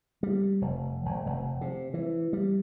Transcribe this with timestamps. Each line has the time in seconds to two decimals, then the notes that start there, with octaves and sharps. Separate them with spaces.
0.23 G3
0.62 F1
1.06 G#1
1.26 F1
1.61 C3
1.94 E3
2.33 G3